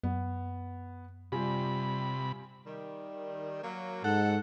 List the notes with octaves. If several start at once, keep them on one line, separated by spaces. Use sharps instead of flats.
F#2 B3
C3 G3 F4 G4 G#5 B5
D#3 G3
F#3 A#3
G#2 A4 F#5